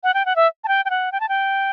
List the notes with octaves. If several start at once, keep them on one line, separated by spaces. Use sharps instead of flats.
F#5
G5
F#5
E5
A5
G5
G5
F#5
G5
A5
G5